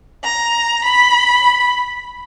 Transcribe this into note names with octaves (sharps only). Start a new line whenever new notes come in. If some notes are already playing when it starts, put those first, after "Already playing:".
A#5
B5